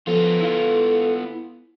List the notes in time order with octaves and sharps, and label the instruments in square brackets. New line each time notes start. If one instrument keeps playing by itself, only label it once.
[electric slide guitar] F3 [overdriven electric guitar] B3 F4 [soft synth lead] A4
[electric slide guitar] E4 F5